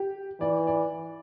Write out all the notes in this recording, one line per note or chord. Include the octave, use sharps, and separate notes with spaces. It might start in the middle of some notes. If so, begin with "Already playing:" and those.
Already playing: G4
E3 D5
D5